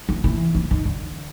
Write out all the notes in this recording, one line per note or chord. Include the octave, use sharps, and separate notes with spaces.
F3
E3
E3
D#3
D3